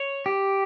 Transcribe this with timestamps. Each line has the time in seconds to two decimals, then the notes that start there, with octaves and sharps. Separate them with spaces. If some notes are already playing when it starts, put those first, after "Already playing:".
Already playing: C#5
0.26 G4